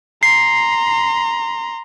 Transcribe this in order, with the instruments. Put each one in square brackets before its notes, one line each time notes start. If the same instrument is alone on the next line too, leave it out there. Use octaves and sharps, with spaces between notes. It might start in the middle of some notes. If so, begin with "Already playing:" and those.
[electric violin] A#5 C6 [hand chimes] C7